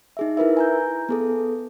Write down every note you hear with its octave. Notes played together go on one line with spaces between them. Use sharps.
D#4 G#4 E5
E4 A#4 B4 E5
G#5 A#5 G6
B3 G#4 A4